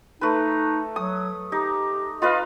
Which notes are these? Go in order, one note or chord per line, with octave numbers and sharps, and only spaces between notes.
A3 D#4 B4
F#3 D#6
D#4 G4
F4 B4 D#5 F5